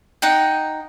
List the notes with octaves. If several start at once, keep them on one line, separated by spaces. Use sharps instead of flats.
D#4 F#5 G5